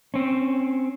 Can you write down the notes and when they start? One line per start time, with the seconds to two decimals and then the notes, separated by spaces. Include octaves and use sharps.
0.14 C4 C#4